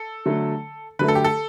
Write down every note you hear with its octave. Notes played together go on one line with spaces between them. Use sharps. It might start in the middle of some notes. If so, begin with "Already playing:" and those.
Already playing: A4
D3 F#3 A3
D3 F#3 A3 B4
A4
G4
A4